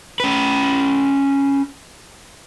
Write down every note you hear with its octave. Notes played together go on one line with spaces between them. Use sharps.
C#4 B4